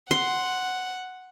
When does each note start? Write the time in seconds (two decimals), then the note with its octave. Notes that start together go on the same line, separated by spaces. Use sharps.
0.11 F#5 C6